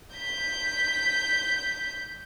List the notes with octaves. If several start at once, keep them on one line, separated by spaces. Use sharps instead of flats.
G6 B6